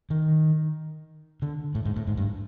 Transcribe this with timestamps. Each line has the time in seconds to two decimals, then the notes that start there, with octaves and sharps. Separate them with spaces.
0.10 D#3
1.42 D3
1.75 A2
1.85 G#2
1.96 A2
2.07 G#2
2.17 G2